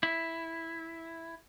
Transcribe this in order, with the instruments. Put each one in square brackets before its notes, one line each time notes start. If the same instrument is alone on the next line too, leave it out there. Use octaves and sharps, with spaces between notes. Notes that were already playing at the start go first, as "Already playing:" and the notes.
[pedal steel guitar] E4